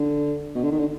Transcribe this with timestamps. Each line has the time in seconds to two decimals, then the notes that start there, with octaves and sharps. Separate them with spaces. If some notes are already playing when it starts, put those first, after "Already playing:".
Already playing: D3
0.55 B2
0.63 D3
0.71 D#3
0.79 D3